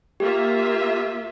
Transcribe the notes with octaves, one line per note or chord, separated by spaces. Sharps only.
A#3 F4 G4 E5